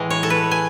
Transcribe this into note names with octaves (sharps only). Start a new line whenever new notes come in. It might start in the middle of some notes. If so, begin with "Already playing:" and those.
Already playing: A2 E3 G#3
C#5
A4
B4
G#5